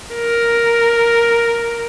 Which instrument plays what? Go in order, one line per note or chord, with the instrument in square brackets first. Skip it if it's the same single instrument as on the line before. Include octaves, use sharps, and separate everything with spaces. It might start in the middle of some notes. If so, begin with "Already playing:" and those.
[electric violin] A#4